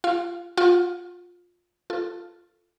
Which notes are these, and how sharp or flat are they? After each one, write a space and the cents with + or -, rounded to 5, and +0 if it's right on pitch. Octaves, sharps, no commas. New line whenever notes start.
F4 -20 F5 +0
F4 +15 F#5 -20
F4 +0 A4 +0